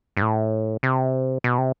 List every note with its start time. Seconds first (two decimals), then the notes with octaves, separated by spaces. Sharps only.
0.17 G2
0.22 A2
0.83 C3
1.44 B2
1.58 C3